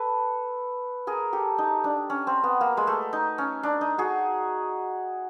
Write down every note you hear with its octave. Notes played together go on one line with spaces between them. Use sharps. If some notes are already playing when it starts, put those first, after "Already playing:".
Already playing: A4 B4
G#4 A#4
G4 A4
D#4
D4
C#4
C4
B3
A#3
G#3
A3
D#4
C#4
D4
D#4
F#4 G#4